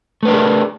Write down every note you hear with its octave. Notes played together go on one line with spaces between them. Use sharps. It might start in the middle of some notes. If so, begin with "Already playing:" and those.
A3 D4 G#4 A#4 B4